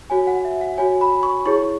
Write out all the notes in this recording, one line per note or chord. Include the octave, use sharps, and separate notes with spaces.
F#4 C#5 G#5
F#5
E5
F#5
F#4 C#5 G#5
B5
C#6
E4 G#4 C#5 C#6